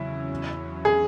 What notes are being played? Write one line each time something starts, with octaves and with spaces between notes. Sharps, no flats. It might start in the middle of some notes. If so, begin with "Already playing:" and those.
Already playing: E2 C#3 F#3 C#4 E4
G#4